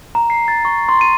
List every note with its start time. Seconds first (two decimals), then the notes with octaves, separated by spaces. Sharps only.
0.15 A#5
0.30 C7
0.48 A6
0.65 C#6
0.89 C6
1.01 D#7